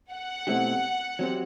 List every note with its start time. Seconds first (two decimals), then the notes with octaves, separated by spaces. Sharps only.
0.12 F#5
0.47 B2 A3 C4 E4 G4
1.19 F#3 C4 G4